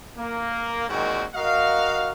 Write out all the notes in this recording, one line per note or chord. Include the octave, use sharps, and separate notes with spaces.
A#3
A#2 D#3 G#3 C4 C#4 F#4
F#4 A#4 D#5 F5